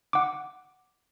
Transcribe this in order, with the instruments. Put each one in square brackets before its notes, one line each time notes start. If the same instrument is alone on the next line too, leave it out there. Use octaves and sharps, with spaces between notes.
[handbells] F#5 D6